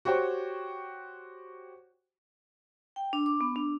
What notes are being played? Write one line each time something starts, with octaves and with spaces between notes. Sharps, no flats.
F#4 G4 C5 C#5 G5
G5
D4
D6
B3
D4